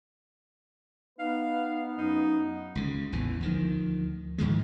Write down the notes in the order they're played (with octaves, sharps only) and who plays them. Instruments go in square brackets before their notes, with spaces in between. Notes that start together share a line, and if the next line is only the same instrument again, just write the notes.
[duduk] B3 [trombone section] D#4 B4 [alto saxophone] F5
[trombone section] F#2 [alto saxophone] D#4
[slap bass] C#2 C#3
A1 E2 E3
D2 D#3 F3
G#2 D#3 F3 G#3